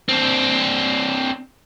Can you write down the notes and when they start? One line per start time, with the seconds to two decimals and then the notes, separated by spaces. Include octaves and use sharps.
0.09 C4 D4